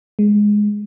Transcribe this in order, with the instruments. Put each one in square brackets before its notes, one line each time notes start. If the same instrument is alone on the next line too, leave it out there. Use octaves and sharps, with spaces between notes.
[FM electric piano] G#3